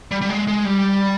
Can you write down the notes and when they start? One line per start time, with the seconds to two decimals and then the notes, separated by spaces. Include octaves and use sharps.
0.11 G3
0.21 G3
0.29 G#3
0.47 G#3
0.65 G3